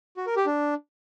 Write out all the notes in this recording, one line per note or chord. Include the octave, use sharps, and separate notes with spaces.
F#4
A#4
G4
D4